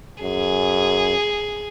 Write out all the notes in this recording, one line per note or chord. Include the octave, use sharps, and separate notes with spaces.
F#2 G#4